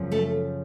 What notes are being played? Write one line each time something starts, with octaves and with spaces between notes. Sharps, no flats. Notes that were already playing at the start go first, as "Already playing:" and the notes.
Already playing: F#2 C#3 F3
A3 A4